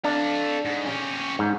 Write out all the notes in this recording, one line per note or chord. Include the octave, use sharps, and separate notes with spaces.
D4 A4 F5
G#2
C#4 G4
G#2